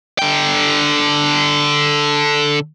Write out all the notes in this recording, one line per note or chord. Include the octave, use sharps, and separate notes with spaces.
D3 G5